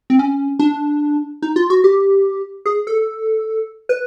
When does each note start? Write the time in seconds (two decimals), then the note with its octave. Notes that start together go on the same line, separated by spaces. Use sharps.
0.10 C4
0.19 C#4
0.59 D4
1.42 D#4
1.56 F4
1.70 F#4
1.84 G4
2.66 G#4
2.87 A4
3.89 B4